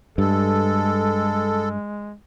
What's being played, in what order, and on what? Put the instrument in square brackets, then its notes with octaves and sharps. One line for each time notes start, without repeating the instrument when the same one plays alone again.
[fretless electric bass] G2 [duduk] G#3 [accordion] A4